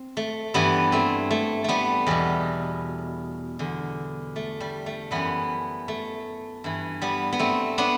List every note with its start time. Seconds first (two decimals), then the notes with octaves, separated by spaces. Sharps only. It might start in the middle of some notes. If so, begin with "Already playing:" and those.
Already playing: C4
0.17 A3
0.54 G2 E3 G3 B3
0.92 A3 C4
1.31 A3
1.64 G3 A3 B3
2.07 E2 B2 G3
3.59 E2 D3
4.36 A3
4.60 G3
4.86 A3
5.11 F#2 E3 G3 B3
5.88 A3
6.64 G2 E3
7.02 G3 B3
7.32 B3
7.39 A3 C4
7.78 B3 D4